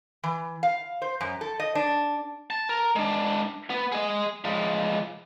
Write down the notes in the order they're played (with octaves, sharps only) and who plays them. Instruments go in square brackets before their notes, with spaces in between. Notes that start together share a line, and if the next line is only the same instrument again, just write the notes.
[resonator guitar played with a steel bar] E3
F5
C5
F#2
A4
D#5
D4
[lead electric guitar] A5
A#4
G#3 D4
B3
G#4 D#5
F3 G#3